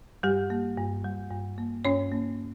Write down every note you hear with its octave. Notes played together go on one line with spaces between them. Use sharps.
G2 G3 G4
A#3
G2
G3
G2
A#3
G2 C#4 C#5
A#3